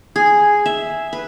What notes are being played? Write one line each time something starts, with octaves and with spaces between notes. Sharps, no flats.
G#4
E5
B4